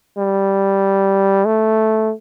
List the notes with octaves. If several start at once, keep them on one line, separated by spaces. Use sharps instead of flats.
G3
A3